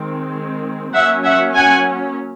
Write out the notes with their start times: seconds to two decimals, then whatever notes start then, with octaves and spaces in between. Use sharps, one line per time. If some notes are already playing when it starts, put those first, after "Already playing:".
Already playing: D#3 G#3 C4
0.94 F#3 A#3 C#4 E5 F#5
1.25 E5 F#5
1.55 F#5 G#5